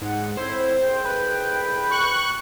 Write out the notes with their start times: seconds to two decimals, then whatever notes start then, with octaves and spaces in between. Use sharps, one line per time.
0.01 G#2 F#5
0.37 A2 C4 E4 C5
0.82 C2 G#4 G5
1.05 B4
1.91 C#6 F#6